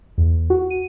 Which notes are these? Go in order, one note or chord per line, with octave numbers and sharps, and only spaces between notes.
E2
F#4
D#7